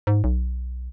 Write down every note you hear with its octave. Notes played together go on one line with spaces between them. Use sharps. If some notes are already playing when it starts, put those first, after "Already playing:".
G#2
B1